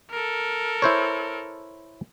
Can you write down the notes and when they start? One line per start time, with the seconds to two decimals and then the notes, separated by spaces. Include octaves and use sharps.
0.11 A4 A#4
0.82 E4 C5 C#5